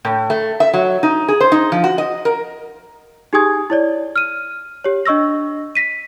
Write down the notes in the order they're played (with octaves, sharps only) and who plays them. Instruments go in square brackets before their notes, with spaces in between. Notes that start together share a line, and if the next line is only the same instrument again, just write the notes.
[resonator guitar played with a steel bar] A2
A3
E5
F#3
D#4
G#4
C5
D#4
F3
F#4
D#5
A#4
[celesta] D#4 G4 G#4 G#5 D#6 G#6
E4 C#5 D5
F6 D#7
G4 C#5
D4 D#5 C#6 E6 A#6
A#6 B6 D#7